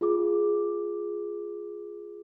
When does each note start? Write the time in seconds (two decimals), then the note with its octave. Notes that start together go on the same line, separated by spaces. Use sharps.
0.01 F4 G#4 D6